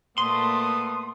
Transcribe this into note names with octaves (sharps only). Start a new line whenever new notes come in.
A#2 A3 B3 C6 D#6